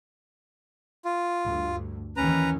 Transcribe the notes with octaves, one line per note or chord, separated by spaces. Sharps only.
F4
D2 G2
D#2 D#3 E3 C#4 B4 A#5